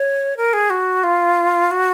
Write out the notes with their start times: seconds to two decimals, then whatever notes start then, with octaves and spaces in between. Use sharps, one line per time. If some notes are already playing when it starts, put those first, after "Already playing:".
Already playing: C#5
0.37 A#4
0.53 G#4
0.70 F#4
1.04 F4
1.71 F#4